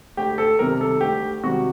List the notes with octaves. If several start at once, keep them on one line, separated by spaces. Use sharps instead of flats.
D2 G4
A4
C3 D#3 G3 A#4
A4
D2 G4
C3 D#3 G3 F#4